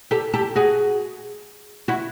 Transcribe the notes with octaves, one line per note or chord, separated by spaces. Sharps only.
G4 A4
G4 A4
F#4 G#4
E4 F#4